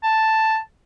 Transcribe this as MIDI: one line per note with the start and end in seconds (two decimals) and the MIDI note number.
0.03 0.58 81